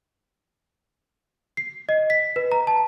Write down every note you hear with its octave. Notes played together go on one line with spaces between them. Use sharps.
C7
D#5
B6
B4
A#5
A5